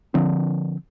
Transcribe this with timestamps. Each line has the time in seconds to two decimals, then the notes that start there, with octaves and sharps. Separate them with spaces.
0.14 D3 F3 C4